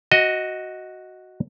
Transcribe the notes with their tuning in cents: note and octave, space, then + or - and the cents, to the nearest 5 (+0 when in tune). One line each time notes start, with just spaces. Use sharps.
F#4 +0 D#5 +10